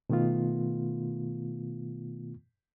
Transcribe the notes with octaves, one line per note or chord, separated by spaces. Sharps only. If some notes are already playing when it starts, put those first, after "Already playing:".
B2 D#3 A3 B3 F4